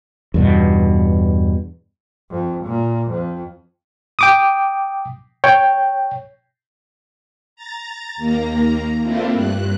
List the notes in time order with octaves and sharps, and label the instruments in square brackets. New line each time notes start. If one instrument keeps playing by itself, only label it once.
[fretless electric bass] E2 G2 B2
[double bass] F2
A#2
F2
[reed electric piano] G5 D6 D#6
C#5 G5
[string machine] A#5 A6
D#2 A#3 A#5
A3 A#3 C4 D4 E4 F4
G2 F#6